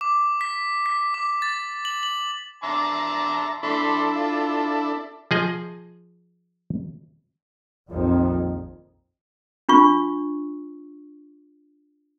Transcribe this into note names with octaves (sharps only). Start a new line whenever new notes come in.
D6
B6
B6
D6
A6
F#7
F#7
E5 A5 A#5 C6 D6
D4 E4 A4 B5 C6 D6
F4
F3 G#4 D#5
A#1 F2 D#3
D4 F4 C#6